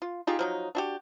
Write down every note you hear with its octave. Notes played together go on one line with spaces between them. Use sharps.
F4
D#4 F4 G4 G#4
F3 F#3 D#4
D4 F#4 G4